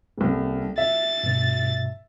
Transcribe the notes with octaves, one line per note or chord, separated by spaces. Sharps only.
D#1 C2
E5 A6
G2 B2